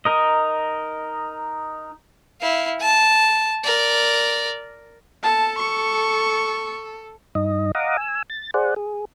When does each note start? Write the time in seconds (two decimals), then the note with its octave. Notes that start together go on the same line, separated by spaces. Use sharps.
0.05 D#4 A#4 D#5
2.41 E4 F5
2.80 A5
3.64 A#4 D5
5.23 A4 A5
5.58 C#6
7.35 G2 D#4 D#5
7.75 D#5 F5 F#5 A#5 D6 D#6
7.97 G#5 E6
8.30 A6
8.54 G#4 C5 D5 F#5
8.76 G#4